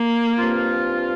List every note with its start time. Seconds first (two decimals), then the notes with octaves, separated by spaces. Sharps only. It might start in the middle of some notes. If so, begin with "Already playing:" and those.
Already playing: A#3
0.38 G2 F3 C4 F4